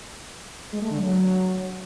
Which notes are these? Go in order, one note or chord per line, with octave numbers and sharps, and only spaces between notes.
G#3
A3
D3
F#3